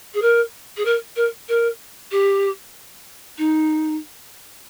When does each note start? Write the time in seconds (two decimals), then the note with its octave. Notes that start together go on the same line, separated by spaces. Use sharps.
0.14 G#4
0.21 A#4
0.77 G#4
0.85 A#4
1.16 A#4
1.48 A#4
2.11 G4
3.37 D#4